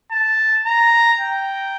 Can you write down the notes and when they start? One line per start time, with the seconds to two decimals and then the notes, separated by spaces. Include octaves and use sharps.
0.12 A5
0.66 A#5
1.20 G5